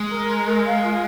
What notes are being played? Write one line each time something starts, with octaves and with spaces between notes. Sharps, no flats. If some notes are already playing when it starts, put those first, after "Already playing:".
Already playing: G#3
A#4
A#5
A#4
F5
F4